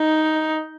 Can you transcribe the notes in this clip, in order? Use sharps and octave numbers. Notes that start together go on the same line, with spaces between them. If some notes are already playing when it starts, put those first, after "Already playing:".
Already playing: D#4